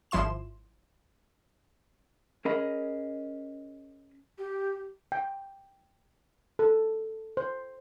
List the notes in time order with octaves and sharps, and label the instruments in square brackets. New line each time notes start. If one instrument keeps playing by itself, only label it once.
[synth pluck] G#1 F3 E4 C6 E7
[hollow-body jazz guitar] C#4 G#4 A#4 D#5 B5
[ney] G4
[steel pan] G5
A4
C5